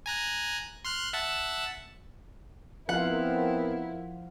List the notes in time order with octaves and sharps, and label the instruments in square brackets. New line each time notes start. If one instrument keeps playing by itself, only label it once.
[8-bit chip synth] G#5 A#5 F#6
C6 F6 F#6
E5 F#5 A5
[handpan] F3 F4 F5 [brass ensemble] B3 C4 A#4 [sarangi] E4 [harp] F#5